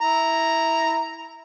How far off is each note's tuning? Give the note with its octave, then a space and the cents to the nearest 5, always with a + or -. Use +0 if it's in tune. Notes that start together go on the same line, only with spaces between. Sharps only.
E4 -10 A#5 +0